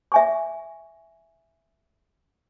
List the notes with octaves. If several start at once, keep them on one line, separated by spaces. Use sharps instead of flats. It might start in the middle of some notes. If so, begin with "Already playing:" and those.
E5 G#5 C#6